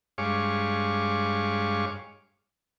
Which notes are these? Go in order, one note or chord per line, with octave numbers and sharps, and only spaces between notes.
G2 G#3 C#5 F5 C#6 D6